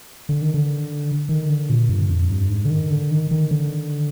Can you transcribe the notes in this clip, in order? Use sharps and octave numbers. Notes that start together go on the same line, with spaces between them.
D3
D#3
D3
D#3
D3
A#2
G2
F2
G2
G#2
D3
D#3
D3
D#3
D#3
D3